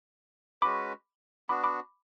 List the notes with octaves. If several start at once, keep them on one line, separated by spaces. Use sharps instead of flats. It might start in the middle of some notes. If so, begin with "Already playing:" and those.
G#3 C#4 F#4 B4 B5 D6
B3 D4 F#4 B5 D6
B5 D6